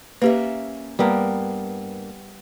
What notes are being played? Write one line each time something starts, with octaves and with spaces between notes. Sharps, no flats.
A#3 C#4 G4 B4 E5
G2 G3 A#3 B3 A#4